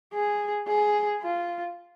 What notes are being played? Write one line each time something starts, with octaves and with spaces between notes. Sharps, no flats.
G#4
G#4
F4